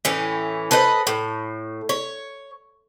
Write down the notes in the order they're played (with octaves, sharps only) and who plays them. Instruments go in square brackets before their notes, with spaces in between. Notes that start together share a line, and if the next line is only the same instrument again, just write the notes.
[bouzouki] A2 E3 C#4
A4 B4 C5 D#5
A2
C#5